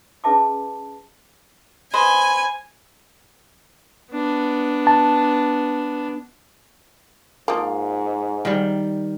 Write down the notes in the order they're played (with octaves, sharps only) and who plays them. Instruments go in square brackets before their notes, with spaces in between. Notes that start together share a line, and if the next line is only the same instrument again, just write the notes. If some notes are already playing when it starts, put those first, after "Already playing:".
[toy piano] C#4 G#4 B4 E5 A5 D6
[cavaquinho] B4 C5 D#5 [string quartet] G#5
[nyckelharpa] B3 D4
[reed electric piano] A5
[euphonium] G#2 [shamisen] F3 A#3
[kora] D#3 G3